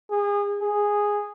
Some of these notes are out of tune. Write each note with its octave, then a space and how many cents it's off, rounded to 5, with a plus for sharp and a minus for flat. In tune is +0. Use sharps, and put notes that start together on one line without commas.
G#4 -30
G#4 -5